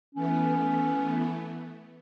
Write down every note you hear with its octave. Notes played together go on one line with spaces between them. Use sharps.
E3 A3 B3 C#4